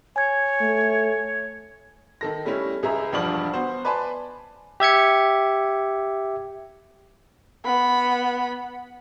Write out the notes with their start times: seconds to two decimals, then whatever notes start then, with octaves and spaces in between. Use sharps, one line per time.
0.16 C#5 G#5 G#6
0.61 A3
2.21 D#3 A4 A#6
2.45 G3 A3 C#4 E4
2.83 C#2 G#4 E5 A#5
3.12 E1 G2 F3 D5 F#7
3.54 B3 F#4 C5
3.85 B4 D5 G#5 A5 B5 C6
4.80 G4 E5 G#6 C#7
7.65 B3 B5